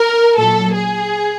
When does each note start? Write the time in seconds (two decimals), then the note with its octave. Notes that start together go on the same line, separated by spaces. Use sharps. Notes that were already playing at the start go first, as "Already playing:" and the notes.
Already playing: A#4
0.37 A#2 F#3 A4
0.73 G#4